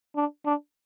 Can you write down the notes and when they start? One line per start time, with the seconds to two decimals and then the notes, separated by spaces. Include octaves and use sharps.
0.16 D4
0.45 D4